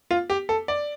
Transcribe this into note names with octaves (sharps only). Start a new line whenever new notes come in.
F4
G4
A4
D5